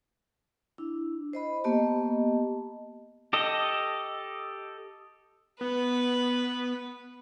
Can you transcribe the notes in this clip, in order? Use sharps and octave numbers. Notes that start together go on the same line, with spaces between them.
D4 E4
C5 D#5 B5
A#3 B3 G4 D#5 A5
G4 A4 D#5
B3 B4